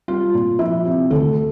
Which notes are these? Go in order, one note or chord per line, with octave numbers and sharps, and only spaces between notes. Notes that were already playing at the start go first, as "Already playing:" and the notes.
G3 F4
A#2
F3 E4
C3
D2 A4